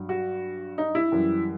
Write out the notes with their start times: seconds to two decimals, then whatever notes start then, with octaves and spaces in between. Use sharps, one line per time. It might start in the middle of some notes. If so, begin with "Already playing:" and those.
Already playing: G2 F#3
0.09 F#4
0.78 D#4
0.95 E4
1.12 F#2 E3 G3